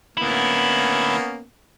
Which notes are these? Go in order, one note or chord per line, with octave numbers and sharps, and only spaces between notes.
D2 A#3 B3 C#4 E4